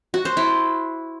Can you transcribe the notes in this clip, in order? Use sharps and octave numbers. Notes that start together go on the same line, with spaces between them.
F#4
C5
E4